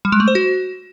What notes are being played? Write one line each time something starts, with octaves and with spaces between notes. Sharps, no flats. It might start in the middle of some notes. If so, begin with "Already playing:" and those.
G3
G#3
A3
C5
F#4